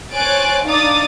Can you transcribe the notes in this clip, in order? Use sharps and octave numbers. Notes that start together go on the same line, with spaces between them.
C5 C#5 G#5 F#6 A6 D7
D4 D#4 F5 D6 D#6 A6